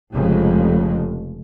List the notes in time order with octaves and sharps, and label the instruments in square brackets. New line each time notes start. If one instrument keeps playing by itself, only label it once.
[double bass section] F1 F2 C#3 G#3